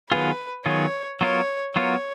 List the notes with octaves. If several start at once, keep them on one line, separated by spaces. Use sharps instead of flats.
D#3 F#3 B3 F4 G#4 B4
D#3 F#3 B3 F4 G#4 C#5
F#3 B3 F4 A#4 C#5
F#3 B3 F4 A#4 C#5